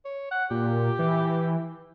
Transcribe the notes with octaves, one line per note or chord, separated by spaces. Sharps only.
C#5
F#5
A#2 G4
E3